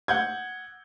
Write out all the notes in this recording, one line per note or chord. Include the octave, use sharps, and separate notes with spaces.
F#5 G6 G#6